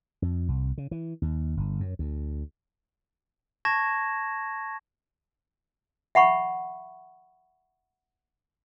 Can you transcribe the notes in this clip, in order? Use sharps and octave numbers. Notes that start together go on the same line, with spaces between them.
F2
C2
C#3
E3
D#2
G1
F#2
D2
A5 C#6 G#6 A#6 E7
E5 F#5 B5 C#6